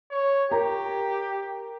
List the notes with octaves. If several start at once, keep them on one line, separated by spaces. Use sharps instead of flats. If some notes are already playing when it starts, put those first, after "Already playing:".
C#5
G4 A#4 A#5